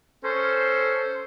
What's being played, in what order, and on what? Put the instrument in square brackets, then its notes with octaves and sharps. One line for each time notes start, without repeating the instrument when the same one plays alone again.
[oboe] C#4 [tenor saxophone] A4 [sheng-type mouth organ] C5